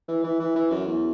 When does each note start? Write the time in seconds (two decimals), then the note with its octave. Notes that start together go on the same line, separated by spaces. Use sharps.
0.08 E3
0.24 E3
0.39 E3
0.56 E3
0.71 F#2
0.87 E2